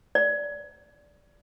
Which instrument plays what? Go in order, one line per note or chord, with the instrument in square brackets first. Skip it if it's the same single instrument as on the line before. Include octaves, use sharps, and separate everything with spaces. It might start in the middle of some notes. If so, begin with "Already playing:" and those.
[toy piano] D5